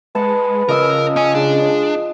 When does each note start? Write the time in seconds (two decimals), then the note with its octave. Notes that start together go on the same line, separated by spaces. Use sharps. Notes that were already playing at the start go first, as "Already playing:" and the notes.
0.15 G#3 B4 F#5 A5
0.69 C#3 F3 A#4 D#5 E6
1.16 C#4 D#5 G#5
1.35 G#3 D4